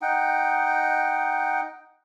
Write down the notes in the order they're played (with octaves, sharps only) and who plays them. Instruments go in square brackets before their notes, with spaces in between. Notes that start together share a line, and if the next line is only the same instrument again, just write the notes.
[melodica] D#4 F#5 G5